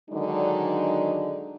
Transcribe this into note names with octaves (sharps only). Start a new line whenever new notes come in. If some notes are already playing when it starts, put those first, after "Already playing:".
D3 D#3 F#3 G#3 D4 D#4